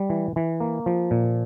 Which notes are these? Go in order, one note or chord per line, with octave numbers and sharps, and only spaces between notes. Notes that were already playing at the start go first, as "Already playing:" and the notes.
Already playing: G3
E3
E3
A#3
F3
A#2